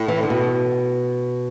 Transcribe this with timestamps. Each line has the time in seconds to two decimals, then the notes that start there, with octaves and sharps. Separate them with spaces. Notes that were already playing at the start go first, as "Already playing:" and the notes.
Already playing: A2
0.08 E3
0.23 D3
0.30 B2